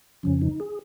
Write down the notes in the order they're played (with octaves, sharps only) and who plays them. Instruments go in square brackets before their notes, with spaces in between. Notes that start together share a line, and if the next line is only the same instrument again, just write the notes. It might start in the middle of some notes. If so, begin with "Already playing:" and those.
[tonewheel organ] F2 C#3 F3 C#4
D#4
G#4